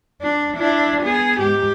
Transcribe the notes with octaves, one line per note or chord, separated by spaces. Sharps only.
D4
D4 E4
B3 G#4
G#2 G4